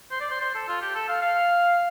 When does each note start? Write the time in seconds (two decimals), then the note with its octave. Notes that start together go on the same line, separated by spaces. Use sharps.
0.11 C5
0.21 D5
0.31 C5
0.41 C5
0.55 A4
0.68 F4
0.81 G4
0.95 A4
1.09 F5
1.22 F5